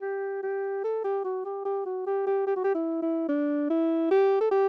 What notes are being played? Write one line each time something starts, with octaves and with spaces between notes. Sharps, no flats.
G4
G4
A4
G4
F#4
G4
G4
F#4
G4
G4
G4
F#4
G4
E4
E4
D4
E4
G4
A4
G4